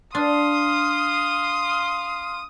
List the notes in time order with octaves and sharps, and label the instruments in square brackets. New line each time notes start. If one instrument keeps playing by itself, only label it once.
[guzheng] D4 [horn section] F5 C6 [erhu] D#6